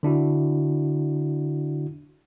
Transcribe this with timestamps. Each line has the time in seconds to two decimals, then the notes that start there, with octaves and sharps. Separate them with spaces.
0.03 D3 D4 E4 F#4